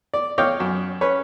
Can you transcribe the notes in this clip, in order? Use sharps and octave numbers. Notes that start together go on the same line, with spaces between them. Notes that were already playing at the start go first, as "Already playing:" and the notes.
D5
C#5 D#5 F5 G5 D6
F#2
C#4 B4 C#5